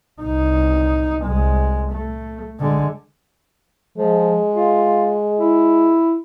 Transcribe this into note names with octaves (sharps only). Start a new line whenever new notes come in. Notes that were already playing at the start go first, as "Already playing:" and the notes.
C2 D#4
C2 G#3
A3
D3 G#3
F3 G#3
F4
E4